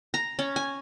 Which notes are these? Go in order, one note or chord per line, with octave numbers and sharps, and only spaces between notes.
A#5
C#4
G#5